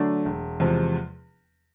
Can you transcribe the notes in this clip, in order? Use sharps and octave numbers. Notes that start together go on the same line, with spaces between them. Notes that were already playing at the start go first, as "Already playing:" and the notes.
Already playing: D3 F#3 A3 D4
E1
E2 C3 F3 G#3